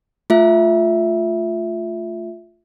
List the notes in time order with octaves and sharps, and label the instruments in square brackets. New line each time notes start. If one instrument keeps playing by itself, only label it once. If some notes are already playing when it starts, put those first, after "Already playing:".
[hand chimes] A3 F4 E5